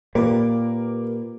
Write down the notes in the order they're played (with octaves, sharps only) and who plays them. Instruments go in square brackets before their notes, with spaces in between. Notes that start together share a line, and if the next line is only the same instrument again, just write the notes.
[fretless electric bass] A#2 [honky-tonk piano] A#3 [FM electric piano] G4 B4 D6